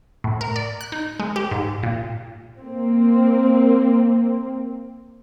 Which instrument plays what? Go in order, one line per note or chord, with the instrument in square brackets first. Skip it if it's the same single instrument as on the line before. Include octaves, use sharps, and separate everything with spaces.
[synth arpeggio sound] A2
A#4
D5
F#6
D#4
G#3
G4
G#2
A#2
[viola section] A#3 C4